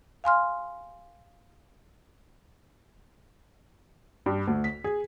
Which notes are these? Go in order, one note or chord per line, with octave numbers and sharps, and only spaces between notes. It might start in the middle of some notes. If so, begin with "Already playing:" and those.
F5 G#5 C6 F6
G2
D2
B6
G#4